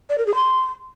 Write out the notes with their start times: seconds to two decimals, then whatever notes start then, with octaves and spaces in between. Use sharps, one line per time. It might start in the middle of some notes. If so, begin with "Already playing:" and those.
0.10 D5
0.18 A#4
0.27 G#4
0.35 C6